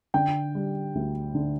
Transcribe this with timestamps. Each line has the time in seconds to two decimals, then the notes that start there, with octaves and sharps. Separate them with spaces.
0.14 D3 G5
0.55 G3
0.95 D2
1.35 D3